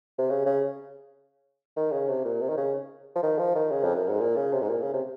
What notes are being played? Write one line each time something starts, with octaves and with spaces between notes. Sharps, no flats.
C3
C#3
C#3
D#3
C#3
C3
A#2
C3
D#3
C#3
F3
D#3
F3
D#3
C#3
F2
F#2
G#2
A#2
C#3
C3
G#2
A#2
C#3
C3